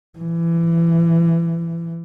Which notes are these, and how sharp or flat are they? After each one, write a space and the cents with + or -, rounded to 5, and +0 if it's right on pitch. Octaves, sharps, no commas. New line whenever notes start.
E3 +25